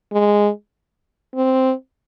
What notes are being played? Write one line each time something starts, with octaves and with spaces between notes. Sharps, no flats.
G#3
C4